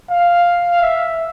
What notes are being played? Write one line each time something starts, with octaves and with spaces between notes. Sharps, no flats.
F5
E5